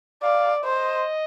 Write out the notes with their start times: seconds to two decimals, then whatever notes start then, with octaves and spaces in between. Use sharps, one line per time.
0.23 D5 F5
0.63 C5 D#5